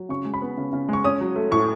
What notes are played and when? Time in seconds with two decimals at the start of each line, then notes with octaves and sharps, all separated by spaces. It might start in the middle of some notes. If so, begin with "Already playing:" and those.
Already playing: F#3
0.09 C#3 C#6
0.25 G#3
0.34 B5
0.42 B3
0.58 C#3
0.73 C#3
0.89 G#3 C#6
1.04 C#4 D#6
1.21 F#3
1.36 A3
1.51 A2 C#6